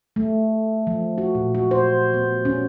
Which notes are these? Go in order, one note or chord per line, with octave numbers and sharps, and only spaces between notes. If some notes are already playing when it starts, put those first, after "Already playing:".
A3
F3
F#4
A#2
F#4
C5
B3
C#4